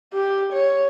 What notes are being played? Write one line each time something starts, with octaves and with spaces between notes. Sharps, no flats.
G4
C#5